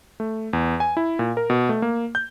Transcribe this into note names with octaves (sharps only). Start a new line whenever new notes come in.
A3
E2
G#5
E4
A#2
A#4
B2
A3
A#3
G6